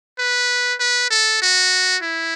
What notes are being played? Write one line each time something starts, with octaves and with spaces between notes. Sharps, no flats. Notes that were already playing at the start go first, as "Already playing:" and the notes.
B4
B4
A4
F#4
E4